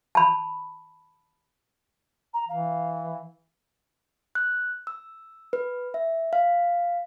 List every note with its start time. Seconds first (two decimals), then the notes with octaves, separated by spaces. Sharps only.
0.15 A5 B5
2.33 A#5
2.49 E3 F5
4.35 F#6
4.87 E6
5.53 B4
5.94 E5
6.33 F5